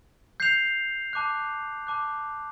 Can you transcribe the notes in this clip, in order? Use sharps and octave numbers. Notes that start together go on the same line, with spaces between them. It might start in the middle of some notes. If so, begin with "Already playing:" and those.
G6 C7 F7
A5 D6 F#6
A5 D6 F#6